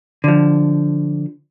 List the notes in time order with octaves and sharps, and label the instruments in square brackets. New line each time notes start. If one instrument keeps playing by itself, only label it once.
[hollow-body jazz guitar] D3 F3